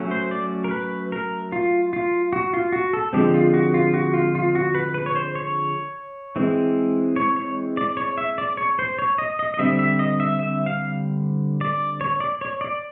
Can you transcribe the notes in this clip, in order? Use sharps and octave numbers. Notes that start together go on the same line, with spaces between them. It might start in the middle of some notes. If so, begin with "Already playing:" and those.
Already playing: F#3 A3 C#4
C5
D5
A#4
B4
A#4
F4
F4
F#4
F4
F#4
A4
D3 F3 G#3 C4 G4
F4
F#4
F4
F#4
F4
F4
F#4
B4
B4
C#5
C5
C#5
E3 G#3 C4
C#5
C#5
D5
C#5
E5
D5
C#5
C5
C#5
D#5
D#5
D#5
D3 G3 C4 E5
E5
D#5
E5
E5
F5
D5
C#5
D5
C#5
D5